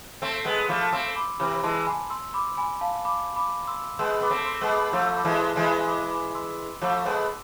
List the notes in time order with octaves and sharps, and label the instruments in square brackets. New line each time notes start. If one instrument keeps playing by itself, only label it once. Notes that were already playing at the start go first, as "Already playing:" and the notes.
[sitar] A3 C4 [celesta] C6 E6
[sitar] G#3 B3 [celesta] C6 E6
[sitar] F3 A3 [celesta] B5 D6
[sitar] A3 C4 [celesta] C6 E6
[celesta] B5 D6
[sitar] C3 E3 [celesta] B5 D6
[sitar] E3 G#3 [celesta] A5 C6
[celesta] G#5 B5
C6 E6
B5 D6
G#5 B5
F5 A5
B5 D6
B5 D6
C6 E6
[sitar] G#3 B3 [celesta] C6 E6
[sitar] B3 [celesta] B5 D6
[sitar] A3 C4
[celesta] C6 E6
[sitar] G#3 B3
[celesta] B5 D6
[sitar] F3 A3 [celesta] C6 E6
[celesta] B5 D6
[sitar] E3 G#3
[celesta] A5 C6
[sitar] E3 G#3
[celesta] G#5 B5
B5 D6
B5 D6
C6 E6
[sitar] F3 A3 [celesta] B5 D6
[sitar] G#3 B3 [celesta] C6 E6